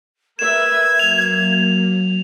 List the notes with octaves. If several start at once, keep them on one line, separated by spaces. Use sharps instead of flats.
A#4 B4 E5 G#6 E7
F#3 A#3 F7